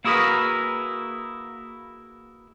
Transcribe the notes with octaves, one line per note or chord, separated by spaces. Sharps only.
A#3 E4 F#4 G#4 A#4 B4